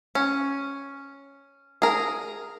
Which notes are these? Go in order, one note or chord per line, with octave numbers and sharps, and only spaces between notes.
C#4
G#4 A#4